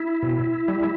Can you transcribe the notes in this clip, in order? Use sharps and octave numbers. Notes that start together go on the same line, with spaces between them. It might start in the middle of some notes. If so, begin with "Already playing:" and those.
Already playing: E4
B2
G3